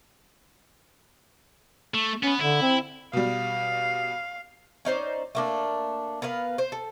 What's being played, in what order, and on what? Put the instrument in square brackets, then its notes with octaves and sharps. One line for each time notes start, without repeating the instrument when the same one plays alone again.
[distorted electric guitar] A3
[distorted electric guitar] B3 B4 [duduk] C#4
[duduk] D3 [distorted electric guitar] E4
[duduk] C4
[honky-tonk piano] B2 G3 [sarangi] F5
[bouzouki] C#4 D#4 C5 D5
A3 A#3 D4
B3 A#4 B4 F5
C5
A4